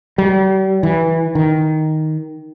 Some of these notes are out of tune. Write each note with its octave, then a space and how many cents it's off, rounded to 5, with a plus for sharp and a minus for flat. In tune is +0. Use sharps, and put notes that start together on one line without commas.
G3 -40
E3 -10
D#3 +5